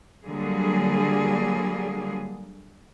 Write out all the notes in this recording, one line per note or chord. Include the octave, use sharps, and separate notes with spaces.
D3 F#3 G3 A#3 G#4